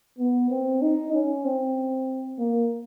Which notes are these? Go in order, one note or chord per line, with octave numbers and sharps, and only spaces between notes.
B3
C4
D#4
C#4
C4
A#3